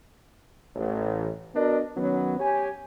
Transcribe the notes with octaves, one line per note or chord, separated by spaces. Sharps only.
A1
B3 D4 F#4 A#4 D#5
D#3 F#3 B3 C#4
G4 C#5 G#5